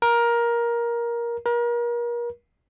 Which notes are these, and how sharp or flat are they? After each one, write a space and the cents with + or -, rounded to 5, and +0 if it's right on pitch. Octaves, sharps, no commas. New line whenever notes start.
A#4 +15
A#4 +35